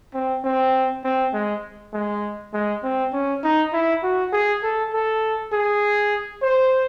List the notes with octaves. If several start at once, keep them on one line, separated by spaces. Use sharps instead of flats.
C4
C4
C4
G#3
G#3
G#3
C4
C#4
D#4
E4
F#4
G#4
A4
A4
G#4
C5